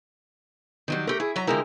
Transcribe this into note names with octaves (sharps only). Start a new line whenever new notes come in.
D#3 F#3 G3
A3 G4 A#4
E4 G#4
F#3 E5 A#5
D3 F3 G#3 E4 G4 A#4